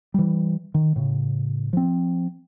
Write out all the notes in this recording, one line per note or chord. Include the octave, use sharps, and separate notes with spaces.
E3 G3
D#3
A2 C#3
F3 C4